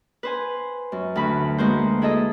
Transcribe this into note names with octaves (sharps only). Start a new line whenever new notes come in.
B4 C5 G#5
F#2
D2 F#4 B4 B5
G#3 A#3 F#4 B4 C5
E4 G#4 A4 D#5 E5